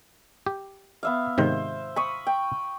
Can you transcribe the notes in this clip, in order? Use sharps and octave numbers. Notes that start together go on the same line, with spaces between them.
G4
B3 E5 F5
G#2 C3 D#3 C5
B5 C#6 D#6
G5